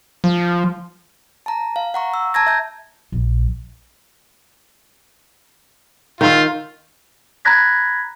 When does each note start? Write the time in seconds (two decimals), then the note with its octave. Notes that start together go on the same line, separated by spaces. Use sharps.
0.24 F3
1.46 A5 A#5
1.76 F5
1.94 F#5 A#5 C#6
2.14 E6
2.34 A5 A#5 G#6 A#6
2.47 E5 G6
3.12 A#1
6.21 D#3 F4 C5 E5
7.45 A#5 B5 F#6 G#6 A#6 B6